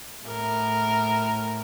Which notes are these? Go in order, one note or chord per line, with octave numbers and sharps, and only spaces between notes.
A2 A#4